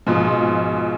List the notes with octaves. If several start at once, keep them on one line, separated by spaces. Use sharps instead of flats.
G#2 B2 F3